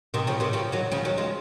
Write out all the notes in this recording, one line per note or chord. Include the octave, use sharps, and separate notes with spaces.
C3 D#3
C#3 F3
C3 D#3
C#3 F3
D#3 F#3
C#3 F3
D#3 F#3
F3 G#3